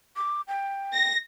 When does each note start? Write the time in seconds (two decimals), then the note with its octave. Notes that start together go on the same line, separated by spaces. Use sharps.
0.16 D6
0.48 G5
0.94 A#6